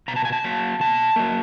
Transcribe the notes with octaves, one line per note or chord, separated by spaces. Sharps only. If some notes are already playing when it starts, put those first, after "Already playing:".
B2 A#5
A5
G#5
A5
F#3 A#3
B2 A5
F#3 A#3